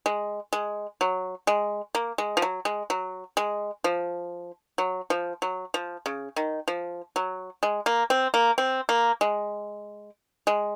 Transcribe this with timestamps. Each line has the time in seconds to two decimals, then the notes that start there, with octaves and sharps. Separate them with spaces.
0.06 G#3
0.53 G#3
1.01 F#3
1.47 G#3
1.95 A#3
2.18 G#3
2.37 F3
2.42 F#3
2.65 G#3
2.90 F#3
3.37 G#3
3.84 F3
4.78 F#3
5.10 F3
5.42 F#3
5.74 F3
6.06 C#3
6.36 D#3
6.68 F3
7.16 F#3
7.63 G#3
7.86 A#3
8.10 C4
8.34 A#3
8.58 C4
8.89 A#3
9.21 G#3
10.47 G#3